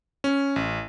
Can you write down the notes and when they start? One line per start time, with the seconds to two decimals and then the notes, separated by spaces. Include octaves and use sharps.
0.24 C#4
0.56 A1